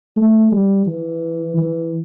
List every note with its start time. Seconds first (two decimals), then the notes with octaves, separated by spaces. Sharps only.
0.17 A3
0.52 G3
0.87 E3
1.58 E3